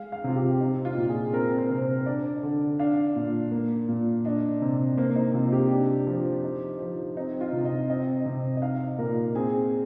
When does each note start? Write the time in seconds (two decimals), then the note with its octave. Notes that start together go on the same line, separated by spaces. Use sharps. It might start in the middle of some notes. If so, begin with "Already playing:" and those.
Already playing: G#3 F5
0.12 F5
0.24 C3 F4
0.36 G4
0.60 C4 D#4
0.85 F4
0.97 A#2
1.09 G#4
1.33 C4 A#4
1.58 C5
1.70 C3
1.82 C5
2.06 D4 D5
2.43 D3
2.79 D4 F5
3.16 A#2
3.52 A#3
3.88 A#2
4.25 D4 D#5
4.62 C3
4.97 A#3 C5
5.16 D#4
5.34 C3 F4
5.52 G4
5.71 D4
6.07 F3
6.44 D#4
6.80 F3
7.17 C4 D#4
7.41 F4
7.53 C3
7.65 D#5
7.89 C4 D#5
8.26 C3
8.57 D#5
8.62 D#4 F5
8.98 A#2 A#4
9.35 C4 G#4